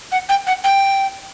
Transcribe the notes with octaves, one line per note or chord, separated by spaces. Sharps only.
F#5
G5
F#5
G5